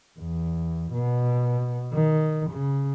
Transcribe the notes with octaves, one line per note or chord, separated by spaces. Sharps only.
E2
B2
D#3
C#3